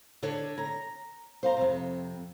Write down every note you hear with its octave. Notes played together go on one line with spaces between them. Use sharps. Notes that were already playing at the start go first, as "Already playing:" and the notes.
D3 D4 C#5
A#5
C5 F5 A#5
F2 C3